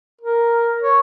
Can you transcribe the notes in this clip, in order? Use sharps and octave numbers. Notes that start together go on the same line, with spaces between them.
A#4
C#5